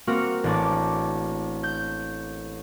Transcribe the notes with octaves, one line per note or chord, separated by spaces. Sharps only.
A#3 C4 F#4 A#4
A1 D4 D6
G6